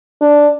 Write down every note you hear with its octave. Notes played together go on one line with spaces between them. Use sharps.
D4